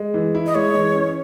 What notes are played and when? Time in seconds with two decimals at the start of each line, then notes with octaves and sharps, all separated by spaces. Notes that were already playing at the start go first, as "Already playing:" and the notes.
Already playing: G#3
0.14 E3
0.35 E4
0.46 D#5
0.55 G#3 C#5
0.75 E3
0.95 C#4